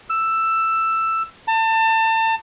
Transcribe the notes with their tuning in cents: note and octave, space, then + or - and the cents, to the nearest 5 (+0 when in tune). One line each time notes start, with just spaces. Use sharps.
E6 +10
A5 +30